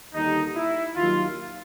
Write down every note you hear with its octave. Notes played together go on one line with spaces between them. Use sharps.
D#2 D3 G3 D#4
E4
D#2 D#3 F#3 F4